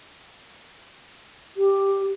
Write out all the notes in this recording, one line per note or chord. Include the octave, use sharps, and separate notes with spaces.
G4